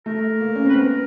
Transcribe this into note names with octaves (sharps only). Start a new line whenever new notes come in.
A3 A#4
A#3
C#4
C4 B4
B3 A#4